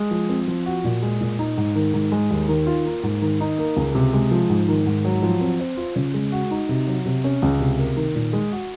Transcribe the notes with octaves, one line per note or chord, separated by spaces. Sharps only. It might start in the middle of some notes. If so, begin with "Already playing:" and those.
Already playing: G#3
F3
C4
F3
F#4
A#2
G#3
A#2
D#4
G#2
D#3
G#2
G#3
D#2
D#3
F4
A#3
G#2
D#3
D#4
A#3
C#2
C3
G#3
F3
G#2
D#3
G#2
F#3
F3
C4
C5
F4
C#3
G#3
F#4
D#4
C3
F#3
C3
C#4
C#2
C3
A#3
D#3
A#2
G#3
F#4